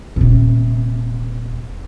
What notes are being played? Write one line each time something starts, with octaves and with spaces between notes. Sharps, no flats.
D#1 C3